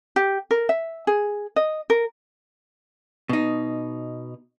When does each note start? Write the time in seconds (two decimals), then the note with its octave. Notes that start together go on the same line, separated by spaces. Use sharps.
0.16 G4
0.51 A#4
0.69 E5
1.07 G#4
1.56 D#5
1.90 A#4
3.29 B2 D#4